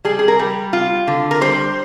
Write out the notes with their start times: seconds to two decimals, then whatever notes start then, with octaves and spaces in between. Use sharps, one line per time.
0.05 G3 G#4
0.19 G#4
0.28 A#4
0.39 G3
0.73 F4
1.07 D3
1.31 A#4
1.41 G3 C5